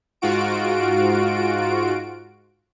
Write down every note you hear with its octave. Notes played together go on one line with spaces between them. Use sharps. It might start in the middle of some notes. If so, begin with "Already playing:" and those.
G#2 F4 F#4 D7